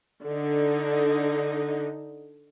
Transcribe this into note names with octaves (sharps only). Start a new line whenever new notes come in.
D3 D#4